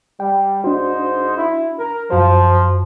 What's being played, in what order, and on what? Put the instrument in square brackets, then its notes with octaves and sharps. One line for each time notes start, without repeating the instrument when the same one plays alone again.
[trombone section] G3 [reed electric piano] G5
[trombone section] G#2 D#4 C5 [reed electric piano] D4 F#4
[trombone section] E4
A#4
[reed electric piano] F#2 F#4 C5 [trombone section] F3